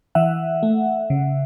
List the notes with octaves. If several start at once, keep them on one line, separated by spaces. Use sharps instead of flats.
E3 E5 F#5
A3
C#3